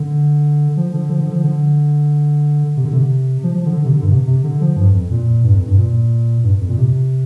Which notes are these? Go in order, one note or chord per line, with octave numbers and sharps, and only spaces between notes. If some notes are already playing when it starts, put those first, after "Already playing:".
Already playing: D3
F3
D3
F3
D3
F3
D3
C3
D3
C3
F3
F3
D3
D3
C3
D3
G2
C3
C3
D3
F3
G2
F2
A#2
G2
F2
G2
A#2
G2
F2
A#2
C3